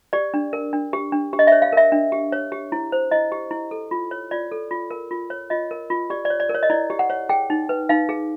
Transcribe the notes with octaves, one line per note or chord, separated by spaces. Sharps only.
G4 D5
D4
A#4
D4
G4
D4
G4
D#5
C#5 E5
F5
A#4 E5
D4
G4
C#5
G4
E4
C5
E4 D#5
G4
E4
A4
F4
C#5
F4 D5
A4
F4
A#4
F4
C#5
F4 D#5
A#4
F4
G4 D5
D5
C#5
D5
A#4
C#5
D#5
E4 D5
G4
F#5
C#5
G#4 G5
D#4
B4
D#4 F5
G#4